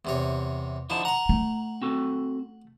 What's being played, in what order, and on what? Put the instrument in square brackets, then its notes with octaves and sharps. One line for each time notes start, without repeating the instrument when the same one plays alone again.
[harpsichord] E2 C3 C#5
[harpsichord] D3 F3 D#4 [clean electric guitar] E4 A5
[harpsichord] F#5 C#6 [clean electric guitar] A#5
[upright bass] A3
[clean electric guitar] C4 F#4 A4